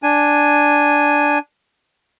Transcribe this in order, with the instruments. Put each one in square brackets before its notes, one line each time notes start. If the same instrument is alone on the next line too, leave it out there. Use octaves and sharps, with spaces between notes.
[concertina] D4 G#5